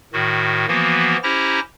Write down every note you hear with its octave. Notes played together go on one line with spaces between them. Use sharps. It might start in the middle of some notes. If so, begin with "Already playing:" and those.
A2 D#3 F#4
E3 F3 A#3 B3 F#4
C#4 E4 G4 C5 A#5 A#6